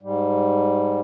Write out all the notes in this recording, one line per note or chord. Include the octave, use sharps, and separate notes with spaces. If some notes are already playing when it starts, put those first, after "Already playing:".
G#2 G3